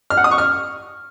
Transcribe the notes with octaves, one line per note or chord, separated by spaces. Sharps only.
F6
F#5
D#6
C#6
F6